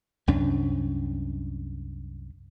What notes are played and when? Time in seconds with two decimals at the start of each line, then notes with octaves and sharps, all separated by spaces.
0.27 C2 F#2 C#4 D4